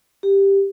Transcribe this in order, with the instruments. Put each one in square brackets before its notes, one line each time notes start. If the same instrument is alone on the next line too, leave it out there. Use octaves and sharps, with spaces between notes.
[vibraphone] G4